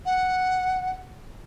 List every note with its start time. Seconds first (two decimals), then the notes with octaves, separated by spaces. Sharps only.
0.06 F#5